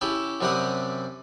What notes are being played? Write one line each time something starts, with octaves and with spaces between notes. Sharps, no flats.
C#4 E4 G4 A4
F#2 C3 G3 G4 F#5 D#6